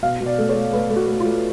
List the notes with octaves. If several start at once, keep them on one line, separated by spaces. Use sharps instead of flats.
B2 F5
B2
D5
A3
C#5
A3
A3 B4
A3
F#4
A3
F4
A3